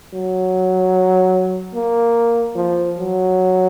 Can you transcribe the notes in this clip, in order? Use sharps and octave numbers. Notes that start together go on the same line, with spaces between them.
F#3
A#3
F3
F#3